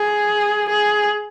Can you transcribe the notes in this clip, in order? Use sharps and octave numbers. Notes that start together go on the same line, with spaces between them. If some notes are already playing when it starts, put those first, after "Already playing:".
Already playing: G#4
G#4